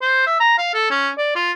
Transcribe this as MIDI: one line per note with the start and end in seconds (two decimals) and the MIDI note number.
0.02 0.25 72
0.27 0.38 76
0.40 0.56 82
0.58 0.72 77
0.74 0.89 69
0.90 1.10 61
1.18 1.32 74
1.36 1.52 65